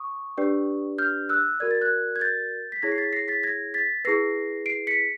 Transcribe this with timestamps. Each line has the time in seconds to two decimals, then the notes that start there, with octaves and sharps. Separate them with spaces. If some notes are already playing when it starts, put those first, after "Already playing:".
Already playing: C#6 D#6
0.37 D4 G4 B4 D5
0.98 F6 G6
1.29 E6 F#6
1.60 F#4 A#4 D5 G#6
1.71 A6
1.81 F#6 G#6
2.16 G#6
2.21 G6 A6
2.72 B6
2.82 E4 G#4 C#5 G#6 A#6
2.92 C7
2.98 A6 B6
3.13 A#6 C7
3.28 A6 B6
3.43 G#6 A#6
3.74 A6 B6
4.05 E4 G#4 B4 A#6 C7
4.66 C7 D7
4.87 B6 C#7